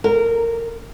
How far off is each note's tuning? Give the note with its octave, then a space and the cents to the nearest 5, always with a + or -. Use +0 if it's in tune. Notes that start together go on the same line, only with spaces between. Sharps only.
A#4 -15